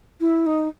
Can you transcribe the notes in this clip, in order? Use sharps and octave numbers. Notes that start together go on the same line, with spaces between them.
E4
D#4